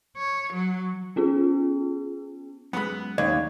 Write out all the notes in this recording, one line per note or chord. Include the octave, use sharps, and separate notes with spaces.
C#5
F#3
B3 C#4 F4 G#4
F#2 G#3 B3 B5
D#2 C#5 D5